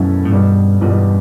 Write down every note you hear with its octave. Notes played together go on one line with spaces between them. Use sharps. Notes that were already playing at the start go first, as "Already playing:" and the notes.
Already playing: F#2 B2 A3 C#4 E4 A4
A2
E2 G2 B2 G3
E2 G2 B2 G3